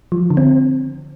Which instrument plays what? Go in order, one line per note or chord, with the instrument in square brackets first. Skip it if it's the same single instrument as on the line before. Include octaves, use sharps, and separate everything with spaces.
[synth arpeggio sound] F3
D3
C4